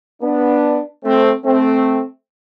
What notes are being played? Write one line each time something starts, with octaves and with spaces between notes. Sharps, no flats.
B3 D4
A3 C4
A3 C4